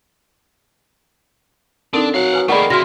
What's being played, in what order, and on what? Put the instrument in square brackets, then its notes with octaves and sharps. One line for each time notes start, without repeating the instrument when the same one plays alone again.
[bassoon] D3 [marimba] C4 D#4 [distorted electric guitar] D4 [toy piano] A#4
[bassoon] F#3 [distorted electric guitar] F5 F#5
[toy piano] B4 G#5 D#6
[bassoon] D#3 [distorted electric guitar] A3 A#3 [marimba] G#4 D5 C#6 [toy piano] F#5 B5
[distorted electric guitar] C#3 E4 [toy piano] F#4 D5 [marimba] C6 F6 A#6